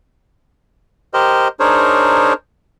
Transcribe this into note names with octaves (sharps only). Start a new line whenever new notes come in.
G4 A#4 C5 D#5
D4 D#4 G#4 A#4 C5 C#5